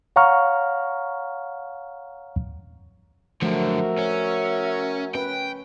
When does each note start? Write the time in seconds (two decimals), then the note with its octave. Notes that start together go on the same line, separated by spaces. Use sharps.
0.16 C#5 F5 F#5 A#5 C#6 F6
3.42 F#2 D3 F3 A3 F#4 A#4 C5 E5
3.99 C#4
5.15 C#4 B4 G5